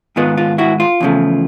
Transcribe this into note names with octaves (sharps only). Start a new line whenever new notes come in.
G#2 D#3 G#3 B3 F4
F4
E4 F#4
F4
E2 C#3 F3 A3